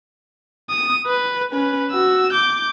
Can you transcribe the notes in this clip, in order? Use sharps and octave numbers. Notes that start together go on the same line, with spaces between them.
D#6
B4
C#4 B4
F#4 E6
D6 G6